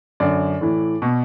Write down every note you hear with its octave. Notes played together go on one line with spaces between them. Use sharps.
F#2 D3 D5
A2 E3
B2